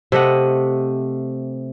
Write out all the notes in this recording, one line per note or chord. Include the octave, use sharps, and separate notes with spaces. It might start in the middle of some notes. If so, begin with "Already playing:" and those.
C3 A3 D#5 F#5